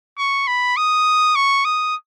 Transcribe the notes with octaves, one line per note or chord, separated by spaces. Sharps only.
C#6
B5
D#6
C#6
D#6